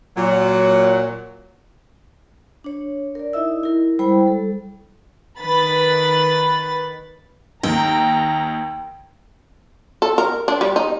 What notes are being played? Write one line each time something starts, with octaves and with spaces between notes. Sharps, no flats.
A#2 F#3
D4 C#5
A#4 D5
D#4 E4 D#5 E5 E6
E4 A#4
G3 G#3 E4 C5 G5 B5
G3 A4
D#3 B4 B5 A6
D#2 G5 A#5
A4
A#4
D4
G3
D#4